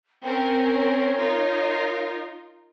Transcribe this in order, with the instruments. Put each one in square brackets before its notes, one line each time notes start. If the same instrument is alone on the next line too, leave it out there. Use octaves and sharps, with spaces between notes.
[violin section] C4 C#4 A#4 [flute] G5
[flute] C#5
[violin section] D#4 F4 A#4